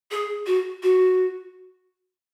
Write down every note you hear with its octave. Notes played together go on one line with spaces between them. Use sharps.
G#4
F#4
F#4